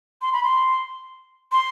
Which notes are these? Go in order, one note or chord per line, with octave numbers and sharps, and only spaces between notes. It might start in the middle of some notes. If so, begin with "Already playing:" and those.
C6
B5
C6
C6